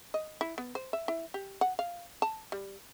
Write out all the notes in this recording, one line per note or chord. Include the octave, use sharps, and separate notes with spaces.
D#5
E4
B3
C5
E5
E4
G4
F#5
F5
A5
G3